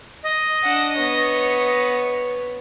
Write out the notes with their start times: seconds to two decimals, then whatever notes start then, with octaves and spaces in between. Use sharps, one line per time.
0.23 D#5
0.63 D4 F#5
0.96 B3 C#5